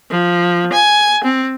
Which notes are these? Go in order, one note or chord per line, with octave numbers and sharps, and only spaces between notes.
F3
G#5
C4